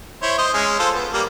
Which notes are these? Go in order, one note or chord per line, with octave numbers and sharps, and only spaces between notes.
E4 C5 C#5
C5 D#5
G#3 C#4
F4 A4 C5
B3
G3 A#3